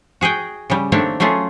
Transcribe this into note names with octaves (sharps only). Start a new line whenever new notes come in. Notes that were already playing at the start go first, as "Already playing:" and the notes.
F#4 G#4 D#5 G5
C#3 G3
D#3 A3 A#3 C4 D4 C#5
F#3 A3 C#4 F4 G#4